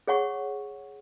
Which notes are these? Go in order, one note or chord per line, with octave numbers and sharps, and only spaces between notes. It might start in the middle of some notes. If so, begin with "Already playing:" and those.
G#4 C#5 F#5 C#6